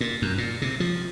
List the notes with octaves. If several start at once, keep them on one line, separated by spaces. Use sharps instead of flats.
A#2
F#2
A#2
C3
F3